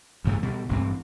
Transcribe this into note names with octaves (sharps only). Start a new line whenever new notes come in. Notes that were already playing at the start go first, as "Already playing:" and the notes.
D2 G2 A3
B2 G3
A1 G2 C4